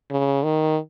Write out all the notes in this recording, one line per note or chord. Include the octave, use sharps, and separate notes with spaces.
C#3
D#3